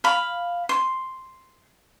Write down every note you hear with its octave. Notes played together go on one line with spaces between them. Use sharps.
F5 B5
C6